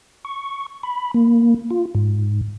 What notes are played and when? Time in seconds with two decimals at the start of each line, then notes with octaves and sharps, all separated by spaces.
0.25 C#6
0.83 B5
1.14 A#3
1.70 F4
1.95 G#2